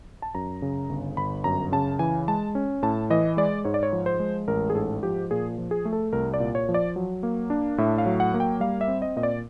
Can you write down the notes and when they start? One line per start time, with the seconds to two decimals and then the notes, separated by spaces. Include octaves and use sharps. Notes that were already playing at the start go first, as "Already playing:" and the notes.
0.22 A5
0.35 F#2 A#5
0.62 C#3
0.89 G1
1.17 G1 B5
1.44 F#2 A#5
1.72 C#3 A5
1.99 E3 G#5
2.28 G#3 A5
2.55 C#4
2.83 A2 A5
3.10 E3 D#5
3.37 G#3 D5
3.65 G#2 C#5
3.74 D5
3.83 C#5
3.93 F3
4.06 C5
4.20 G#3
4.48 A1 A#4
4.70 G#4
4.75 G#2 A4
5.03 F3 G4
5.31 A#2 G#4
5.58 F3
5.71 G#4
5.85 A3
5.93 A4
6.12 C2 A#4
6.34 D5
6.40 A#2
6.55 C#5
6.69 F3
6.74 D5
6.96 F#3
7.23 A#3
7.50 D4
7.78 A2 E5
7.98 F5
8.06 F#3
8.20 F#5
8.34 A#3
8.40 G5
8.60 G3 F5
8.81 E5
8.88 C4
9.02 D#5
9.16 A#2 D#5
9.23 D5